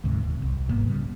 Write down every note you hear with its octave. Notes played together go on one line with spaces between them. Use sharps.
D2 G#2 C3
D#1
C2
G1 G#2 A#3 B3
C#3 G3